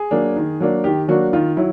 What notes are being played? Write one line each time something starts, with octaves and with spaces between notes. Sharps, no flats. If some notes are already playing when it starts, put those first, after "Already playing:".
Already playing: G#4
F#3 A#3 D4
D#3
F#3 A#3 D4
D#3 G4
F#3 A#3 D4 F#4
D#3 F4
F#3 E4